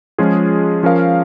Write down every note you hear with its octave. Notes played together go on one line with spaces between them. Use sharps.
F3 G#3 C#4 F4 G#4
F3 C#4 A#4 F5